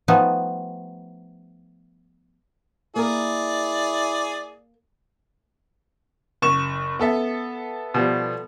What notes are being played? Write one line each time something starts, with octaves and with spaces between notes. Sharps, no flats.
F3 G3 A3 B3 D#4
A#3 E4 G#4 A#4 D5
F#1 C#6 E7
B3 A4 E5
B2 F3 G3